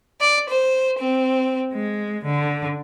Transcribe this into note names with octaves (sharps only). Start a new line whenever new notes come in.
D5
C5
C4
G#3
D3